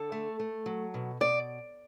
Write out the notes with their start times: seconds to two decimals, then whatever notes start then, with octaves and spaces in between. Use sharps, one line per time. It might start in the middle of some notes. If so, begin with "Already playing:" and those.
Already playing: D3 A4
0.12 A3
0.40 A3
0.66 F#3
0.94 B2
1.20 B2 D5